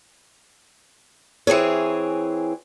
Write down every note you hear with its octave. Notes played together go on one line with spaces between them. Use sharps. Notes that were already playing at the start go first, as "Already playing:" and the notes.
E3 C4 G#4 C#5